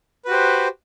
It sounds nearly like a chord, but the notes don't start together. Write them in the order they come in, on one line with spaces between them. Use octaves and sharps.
B4 F#4 G4 C5